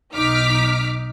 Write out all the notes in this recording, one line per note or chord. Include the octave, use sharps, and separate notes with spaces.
B1 D#4 D6 F6 B6